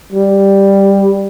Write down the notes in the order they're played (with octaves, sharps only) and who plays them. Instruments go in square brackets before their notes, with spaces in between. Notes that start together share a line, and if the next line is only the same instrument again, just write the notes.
[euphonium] G3